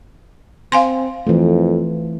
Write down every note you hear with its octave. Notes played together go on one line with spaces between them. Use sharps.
C4 F5 G#5 C6
F2 E3 A3